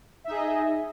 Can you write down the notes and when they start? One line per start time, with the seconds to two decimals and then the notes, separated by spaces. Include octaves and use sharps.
0.24 E5
0.27 D#4
0.31 G#4
0.34 D#5